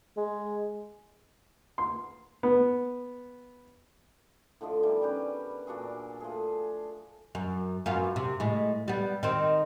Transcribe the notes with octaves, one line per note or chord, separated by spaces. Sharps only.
G#3
C6
B3
A2 D3 F3 D#5
D#3 E3 G3 B3
G3 C#4 G4 B4
A#2 D4 F#4 G#4
F3 A3 G#4
F#2
F#2 B3 F4
C3
A2 G#3
G3 B3
D#3 C4